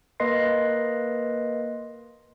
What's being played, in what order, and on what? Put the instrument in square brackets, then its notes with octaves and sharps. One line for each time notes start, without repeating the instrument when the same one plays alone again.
[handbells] A#3 A#4 B4 D#5 C6 C7